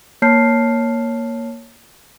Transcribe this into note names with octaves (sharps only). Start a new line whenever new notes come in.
A#3 C#5 A5 F6 G6 C7